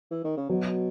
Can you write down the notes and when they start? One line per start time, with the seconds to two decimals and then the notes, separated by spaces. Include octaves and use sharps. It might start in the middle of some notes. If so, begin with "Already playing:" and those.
0.11 E3
0.24 D#3
0.37 C#3
0.50 B2 F#3